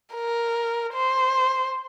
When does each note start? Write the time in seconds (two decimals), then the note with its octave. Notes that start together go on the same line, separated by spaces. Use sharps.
0.15 A#4
0.94 C5